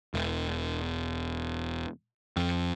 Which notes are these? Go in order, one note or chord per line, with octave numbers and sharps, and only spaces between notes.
E1
F2